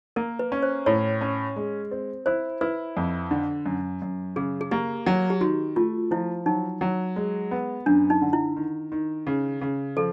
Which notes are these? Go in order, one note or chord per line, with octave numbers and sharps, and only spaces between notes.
A#3 A#4
B4
C#4
C5
A2 C#5
C#4
G#3
C4
E4 C5
E4 B4
F2
D3
F#2
F#2
C#3 G#4
G#4
A#3 G4
F#3
G4
D#3 F#4
A3 F4
F3 E4
F#3 D#4
F#3
G#3
B3
F#2 D4
D#4
D3
E4
D#3
D#3
C#3
C#3
F3 A4